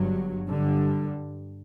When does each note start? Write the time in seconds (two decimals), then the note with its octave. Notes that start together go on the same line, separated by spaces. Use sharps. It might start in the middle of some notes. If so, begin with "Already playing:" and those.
Already playing: G1 G2 F#3
0.48 G2 D3 G3